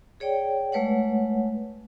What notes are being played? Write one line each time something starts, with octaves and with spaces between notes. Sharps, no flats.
G#4 C#5 D5 G5
G#3 A3 B4 C#5 F#5